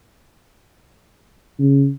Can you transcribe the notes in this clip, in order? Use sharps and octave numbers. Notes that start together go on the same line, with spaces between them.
C#3